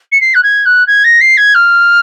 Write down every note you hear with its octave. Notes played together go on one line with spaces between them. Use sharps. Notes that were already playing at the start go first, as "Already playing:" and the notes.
C#7
C7
F#6
G#6
F#6
G#6
A#6
C7
G#6
F6